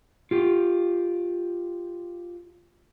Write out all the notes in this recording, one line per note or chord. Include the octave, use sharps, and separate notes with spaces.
F4 G4